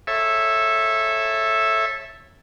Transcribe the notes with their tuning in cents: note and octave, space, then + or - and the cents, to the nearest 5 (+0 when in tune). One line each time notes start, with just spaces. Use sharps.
A4 +0 C#5 -20 E5 +0